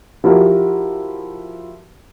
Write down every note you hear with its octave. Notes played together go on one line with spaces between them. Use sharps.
F3 E4 F#4 G4 A#4